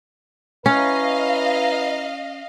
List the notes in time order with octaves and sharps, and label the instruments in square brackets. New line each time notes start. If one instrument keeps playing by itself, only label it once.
[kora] C#4 [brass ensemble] E4 B4 A#5 [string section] D#5 F5